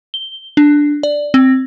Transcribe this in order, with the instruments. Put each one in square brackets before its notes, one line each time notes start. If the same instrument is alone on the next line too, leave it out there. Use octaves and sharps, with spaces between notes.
[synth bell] G7
D4
D5
C4